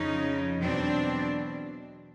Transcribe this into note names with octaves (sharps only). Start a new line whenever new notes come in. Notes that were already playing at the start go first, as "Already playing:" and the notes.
Already playing: F2 C#3 F3 C#4 D#4
E2 B2 F#3 C4 D4